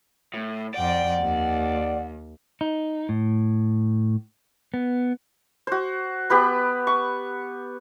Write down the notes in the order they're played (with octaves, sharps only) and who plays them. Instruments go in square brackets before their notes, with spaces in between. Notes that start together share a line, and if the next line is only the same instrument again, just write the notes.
[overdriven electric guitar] A2
[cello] F2 G5 [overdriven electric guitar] D5 [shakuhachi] F#5
[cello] D#2
[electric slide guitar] D#4
A2
B3
[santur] F#4 C5
B3 G4 B4 B5
C#6